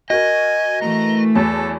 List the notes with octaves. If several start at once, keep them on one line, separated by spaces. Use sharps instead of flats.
F#4 A#4 D#5 G#5
E3 A3 A#5
E2 F#3 A4 A5